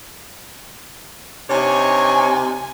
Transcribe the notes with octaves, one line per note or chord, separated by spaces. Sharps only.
C3 D4 D#4 C#5 G#5